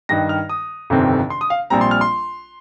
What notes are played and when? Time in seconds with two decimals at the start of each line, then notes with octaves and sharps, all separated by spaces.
0.09 G2 D#3 G3 D#4 A#6
0.29 F6
0.49 D#6
0.90 G1 F2 C3 D#3 C4
1.30 C6
1.41 D#6
1.50 F5
1.70 A#1 A#2 G3 C4 A#5
1.81 C6
1.91 F6
2.01 C6